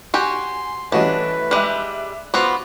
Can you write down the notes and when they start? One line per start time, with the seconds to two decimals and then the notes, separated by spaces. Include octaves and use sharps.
0.14 F#4 G4 G#5 C6
0.92 E3 G3 A3 C#4 D4 F#4 B4 D#5
1.51 G3 G#3 E5 D6 F#6
2.34 B3 F4 F#4 C5 B5 D6